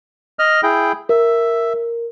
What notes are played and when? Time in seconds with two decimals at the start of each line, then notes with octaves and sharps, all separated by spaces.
0.39 D#5 F6
0.63 E4 G#4 G5
1.09 A#4 E5